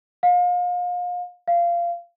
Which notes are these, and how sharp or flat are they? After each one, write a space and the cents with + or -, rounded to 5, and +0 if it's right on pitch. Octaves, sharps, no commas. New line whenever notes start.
F5 +35
F5 -20